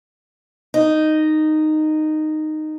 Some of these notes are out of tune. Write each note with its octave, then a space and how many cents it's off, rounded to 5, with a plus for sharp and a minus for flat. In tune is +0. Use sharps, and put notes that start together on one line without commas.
D#4 -10